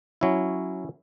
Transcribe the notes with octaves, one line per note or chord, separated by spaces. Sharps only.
F#3 C#4 E4